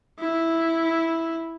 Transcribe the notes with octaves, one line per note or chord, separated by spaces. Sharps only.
E4